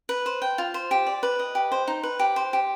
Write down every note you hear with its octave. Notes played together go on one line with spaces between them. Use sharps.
B4
C5
G5
F4
C5
G4
D5
B4
D#5
G4
C5
D#4
B4
G4
C5
G4